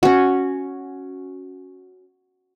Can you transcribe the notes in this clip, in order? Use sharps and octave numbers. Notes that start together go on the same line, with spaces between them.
C#4 F#4